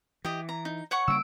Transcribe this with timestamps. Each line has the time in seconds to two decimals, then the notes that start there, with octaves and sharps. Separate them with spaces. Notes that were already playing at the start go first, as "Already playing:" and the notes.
0.25 E3 G4 D#5
0.49 A#5
0.65 D#4
0.91 C#5 F#5 C#6
1.08 C#3 G3 A#3 E6 D7